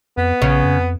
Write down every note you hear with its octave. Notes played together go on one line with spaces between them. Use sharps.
F2 B3
A#1 C#3
F2